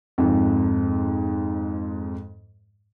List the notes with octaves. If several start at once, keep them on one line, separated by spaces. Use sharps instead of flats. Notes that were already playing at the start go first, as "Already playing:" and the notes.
F2 G#2